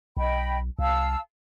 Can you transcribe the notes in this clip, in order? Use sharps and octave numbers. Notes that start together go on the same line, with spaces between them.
B1 D#5 G5 B5
C2 F5 A5 E6